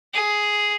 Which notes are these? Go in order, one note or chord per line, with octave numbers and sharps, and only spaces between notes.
G#4